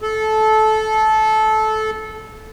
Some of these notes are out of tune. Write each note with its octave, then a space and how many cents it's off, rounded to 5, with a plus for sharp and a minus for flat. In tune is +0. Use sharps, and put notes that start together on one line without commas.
A4 -20